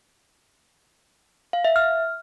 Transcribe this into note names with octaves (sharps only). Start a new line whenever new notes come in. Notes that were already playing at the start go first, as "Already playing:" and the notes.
F5
E5
F6